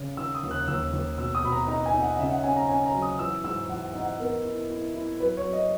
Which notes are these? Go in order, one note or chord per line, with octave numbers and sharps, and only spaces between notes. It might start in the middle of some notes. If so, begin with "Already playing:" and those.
Already playing: C#3
D#3 E6
D#6
D#2
F#6
D#2 E6
D#2
B2 E6
D#6
B2 B5
A#5
D#4 A#5
G#5
D#4
F#5
C#3 E5
F#5
C#4 G#5
A#5
C#4 G#5
A#5
F#3
D#6
E3 E6
G#2 E6
E3 F#5
F#5
D#4
F#5
B3 A#4
E4
E4
E4
F#3 B4
C#5
F#3
D#5